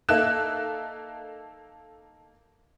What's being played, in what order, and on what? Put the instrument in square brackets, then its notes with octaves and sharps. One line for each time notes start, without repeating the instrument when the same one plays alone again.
[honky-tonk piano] A#3 D#4 A4 E5 F#6 E7